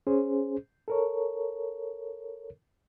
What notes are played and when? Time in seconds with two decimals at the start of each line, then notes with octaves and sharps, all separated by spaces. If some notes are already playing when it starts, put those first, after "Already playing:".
0.07 C#4 G#4 C5
0.88 A4 A#4 C#5